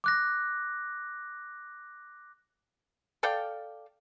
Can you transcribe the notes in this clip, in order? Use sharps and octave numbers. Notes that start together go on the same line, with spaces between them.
D6 F#6 A#6
A4 D5 F5 G5